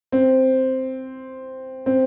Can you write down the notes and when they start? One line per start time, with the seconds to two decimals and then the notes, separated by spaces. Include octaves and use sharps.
0.12 C4
1.86 C4